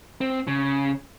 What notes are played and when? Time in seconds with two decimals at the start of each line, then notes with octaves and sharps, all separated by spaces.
0.21 C4
0.47 C#3